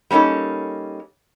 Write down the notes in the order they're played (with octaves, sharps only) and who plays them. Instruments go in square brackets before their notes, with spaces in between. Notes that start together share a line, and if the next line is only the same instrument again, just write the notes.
[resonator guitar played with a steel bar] G3 A#3 C#4 D#4 A4